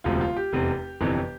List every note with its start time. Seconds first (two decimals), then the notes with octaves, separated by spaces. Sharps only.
0.04 E1 D2 C3 F3 F4
0.21 F4
0.37 G4
0.53 F1 E2 C3
1.01 G1 F2 C3 E3